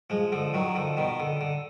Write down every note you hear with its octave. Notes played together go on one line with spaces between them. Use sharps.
F3 G#3
D3 F3
D#3 F#3
D3 F3
B2 D#3
D3
D3